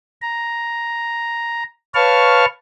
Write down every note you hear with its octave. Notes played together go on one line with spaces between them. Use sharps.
A#5
B4 C#5 F5 A5 C#6 F6